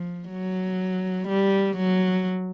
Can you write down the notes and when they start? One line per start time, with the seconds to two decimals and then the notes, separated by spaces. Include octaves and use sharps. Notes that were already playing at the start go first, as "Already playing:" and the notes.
Already playing: F3
0.30 F#3
1.28 G3
1.76 F#3